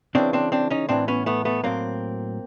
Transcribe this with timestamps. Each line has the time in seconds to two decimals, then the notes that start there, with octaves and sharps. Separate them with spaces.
0.15 C#3 E3 C4 D4
0.33 C4 D4
0.52 C4 D4
0.70 C#4 D#4
0.89 A2 E3 C4 D4
1.08 B3 C#4
1.26 A3 B3
1.45 A3 B3
1.63 A2 F#3 A#3 C4